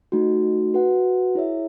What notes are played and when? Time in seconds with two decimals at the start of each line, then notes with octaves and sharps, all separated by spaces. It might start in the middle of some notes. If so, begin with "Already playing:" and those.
0.12 A3 D#4 F#4
0.74 F#4 B4 F#5
1.35 E4 G#4 C#5 E5